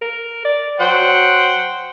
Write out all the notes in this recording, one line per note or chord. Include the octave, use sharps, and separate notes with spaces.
A#4
D5
F#3 C5 F#5 G5